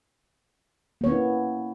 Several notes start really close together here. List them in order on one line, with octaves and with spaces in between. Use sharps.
A#3 C#5 B3 C#4 E4